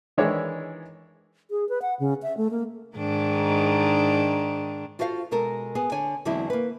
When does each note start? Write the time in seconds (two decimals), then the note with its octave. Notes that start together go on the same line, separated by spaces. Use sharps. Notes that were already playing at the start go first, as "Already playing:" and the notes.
0.17 D#3 E3 G#3 D4 E4 C#5
1.51 G#4
1.69 B4
1.82 F#5
2.00 C#3
2.23 E5
2.37 A3
2.51 A#3
2.97 G#2 D#3 D4
4.99 F4 F#4 A4 C5 E5 F5
5.31 B2 G#3 A4 A#4
5.75 B3 G#4
5.92 D3 C#5 G#5
6.25 E2 D3 F#3 G#3 C4 E4
6.50 A#3 B4